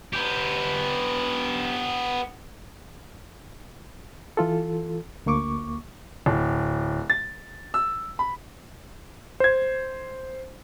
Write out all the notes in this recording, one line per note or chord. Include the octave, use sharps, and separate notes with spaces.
B3 G4
E3 F4 A4
D2 A#3 C#6 D6
D1
A6
E6
B5
C5 G#6